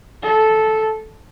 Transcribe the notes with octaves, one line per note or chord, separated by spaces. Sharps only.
A4